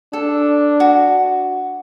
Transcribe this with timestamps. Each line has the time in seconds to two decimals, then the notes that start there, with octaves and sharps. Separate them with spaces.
0.13 D4 A4
0.80 F#4